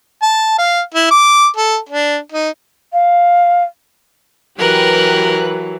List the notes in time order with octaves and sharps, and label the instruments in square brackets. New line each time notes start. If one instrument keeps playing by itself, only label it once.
[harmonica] A5
F5
E4
D6
A4
D4
D#4
[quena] F5
[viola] E3 F#3 [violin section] G4 B4 F#6 [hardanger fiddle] A#4